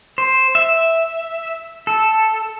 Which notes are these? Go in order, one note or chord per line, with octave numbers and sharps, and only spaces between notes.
C5
E5
A4